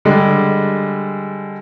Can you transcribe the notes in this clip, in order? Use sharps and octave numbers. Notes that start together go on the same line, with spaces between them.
D3 G3 G#3